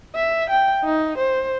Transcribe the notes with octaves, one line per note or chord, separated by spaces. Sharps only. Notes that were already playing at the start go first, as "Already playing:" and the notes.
E5
G5
D#4
C5